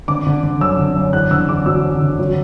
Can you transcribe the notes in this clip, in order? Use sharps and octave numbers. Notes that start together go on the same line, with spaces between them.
D3 D6
D3
D3
F#2 E6
D3
F#2
E2 F#6
D3 E6
E2 D6
F#3 E6
D3
D3
F#3